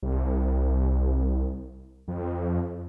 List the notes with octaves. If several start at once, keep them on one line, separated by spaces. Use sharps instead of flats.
C2
F2